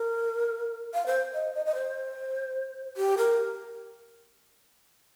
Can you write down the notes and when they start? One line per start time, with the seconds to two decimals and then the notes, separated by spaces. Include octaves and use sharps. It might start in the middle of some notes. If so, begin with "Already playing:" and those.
Already playing: A#4
0.94 F5
1.06 C5
1.34 D#5
1.55 D#5
1.66 D#5
1.75 C5
2.97 G4
3.18 A#4